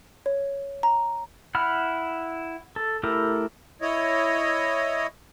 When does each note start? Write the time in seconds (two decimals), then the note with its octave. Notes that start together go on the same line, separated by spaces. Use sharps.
0.26 C#5
0.83 A#5
1.55 E4 F#5 B5 F6
2.76 A4
3.03 A3 E4 G4 A4 A#4
3.81 E4 C#5 D#5